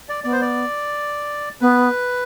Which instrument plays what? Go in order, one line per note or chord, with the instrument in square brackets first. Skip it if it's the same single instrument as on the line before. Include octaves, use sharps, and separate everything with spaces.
[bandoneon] D5
[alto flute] B3 [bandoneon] D5
[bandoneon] C5
D5
[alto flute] B3 [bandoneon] B4